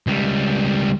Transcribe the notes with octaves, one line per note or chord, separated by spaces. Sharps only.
C#2 G3